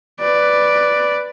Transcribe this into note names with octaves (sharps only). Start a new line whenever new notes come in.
B4 D5